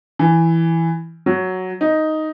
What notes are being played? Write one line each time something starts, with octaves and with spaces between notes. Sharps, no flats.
E3
F#3
D#4